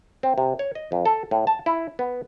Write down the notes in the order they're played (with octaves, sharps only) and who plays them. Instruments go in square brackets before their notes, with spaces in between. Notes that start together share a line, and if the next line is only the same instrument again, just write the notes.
[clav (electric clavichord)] C4
C3
C#5
D#5
F2
A4
A2
A5
E4
B3